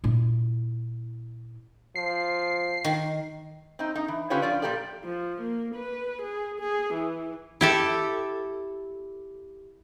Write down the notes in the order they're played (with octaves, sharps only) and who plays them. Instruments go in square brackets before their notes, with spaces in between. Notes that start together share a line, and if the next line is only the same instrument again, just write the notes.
[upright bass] A#2 E4
[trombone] F3 [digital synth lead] C7
[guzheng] D#3
[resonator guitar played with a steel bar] C4 D#4
D#4
E3
D3 C#4 F4 G4 B4 C#5
F3 F4 D5
A#2 D#3 F3 G4 A4 D5
[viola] F3
A#3
B4
G#4
G#4
E3
[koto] E4 G4 A4